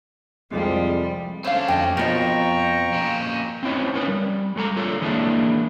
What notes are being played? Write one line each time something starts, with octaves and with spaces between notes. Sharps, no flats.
C2 F2 F3 G3 G#3
A3 C#4 D4 C5 F5
F2 C5 D#5 G5
F2 B2 F3 A#4 D#5 G5 A#5 C#6
A#2 C#4
C4 C#4 D#4 E4 C5 C#5
C#4 A#4 B4
G3
G#3 A4 A5 A#5
D4 F4 A4 C#5
E3 G#3 A#3 B3 D4 E4